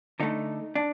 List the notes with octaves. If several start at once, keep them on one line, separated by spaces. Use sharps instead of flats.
D3 A3 D#4
D4